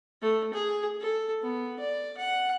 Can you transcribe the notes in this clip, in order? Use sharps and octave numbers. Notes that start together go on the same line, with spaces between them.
A3
G#4
A4
B3
D5
F#5